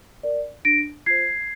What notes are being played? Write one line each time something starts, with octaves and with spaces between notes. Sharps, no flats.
A#4 D5
D4 A#6 D7
F4 C5 G#6 C7